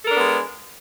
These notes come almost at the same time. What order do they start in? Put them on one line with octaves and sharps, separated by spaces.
A4 A#4 D4 B3 G#3